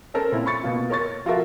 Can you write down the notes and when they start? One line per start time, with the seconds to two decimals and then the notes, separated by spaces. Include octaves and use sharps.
0.14 C#4 A4 A#4 C5
0.32 A#2 C4 E4
0.46 B5 C#6 A6 C#7
0.63 B2 A#3 F4
0.90 A#4 C#5 C#6 A6
1.25 F3 F4 F#4 A4 A#4 E5